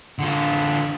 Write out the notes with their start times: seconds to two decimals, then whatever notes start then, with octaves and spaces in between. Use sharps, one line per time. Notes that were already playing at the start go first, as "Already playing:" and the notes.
0.19 D3 F4